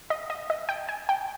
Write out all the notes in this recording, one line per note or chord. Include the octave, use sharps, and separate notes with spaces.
D#5
D#5
D#5
G5
G#5
G5